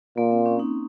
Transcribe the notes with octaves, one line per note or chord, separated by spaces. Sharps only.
A#2 A#3
C4
C#4
D#4